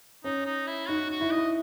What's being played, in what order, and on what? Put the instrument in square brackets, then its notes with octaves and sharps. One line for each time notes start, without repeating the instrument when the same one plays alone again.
[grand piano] C#4 [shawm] D#4
[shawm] D#4
E4
[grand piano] D#4 [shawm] F#4
[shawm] F#4
[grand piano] E4
[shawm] D#5
[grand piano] E4